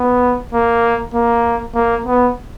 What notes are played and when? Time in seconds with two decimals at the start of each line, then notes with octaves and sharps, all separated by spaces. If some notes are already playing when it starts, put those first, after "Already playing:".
Already playing: B3
0.53 A#3
1.14 A#3
1.75 A#3
2.06 B3